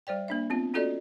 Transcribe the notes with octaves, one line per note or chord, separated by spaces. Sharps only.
G3 C5 D5 G5
A#3 D4 E5
B3 C4 F4
C#4 F4 F#4 A4 D5 D#5